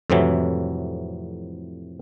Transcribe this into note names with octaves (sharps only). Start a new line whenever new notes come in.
F2 A2 C3 E3 F#3